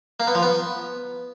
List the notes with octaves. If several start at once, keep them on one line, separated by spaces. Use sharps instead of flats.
A#3
B3
F3
B3